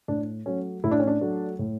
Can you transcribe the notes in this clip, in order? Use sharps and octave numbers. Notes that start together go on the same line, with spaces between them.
A2 D4
F#3 A3 C#4
A2 E4
D4
C#4
D4
F#3 A3
A2